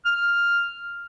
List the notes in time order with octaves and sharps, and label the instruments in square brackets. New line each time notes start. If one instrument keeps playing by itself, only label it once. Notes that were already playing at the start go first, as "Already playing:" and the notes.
[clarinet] F6